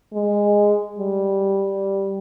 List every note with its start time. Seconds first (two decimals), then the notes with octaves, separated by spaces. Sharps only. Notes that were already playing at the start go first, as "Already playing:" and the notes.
0.13 G#3
0.98 G3